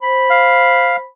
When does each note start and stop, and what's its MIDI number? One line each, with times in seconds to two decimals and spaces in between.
0.02 1.06 72
0.02 1.06 83
0.30 0.96 77